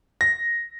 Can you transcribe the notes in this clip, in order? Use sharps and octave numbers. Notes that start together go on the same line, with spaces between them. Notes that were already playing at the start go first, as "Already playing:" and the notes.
A#6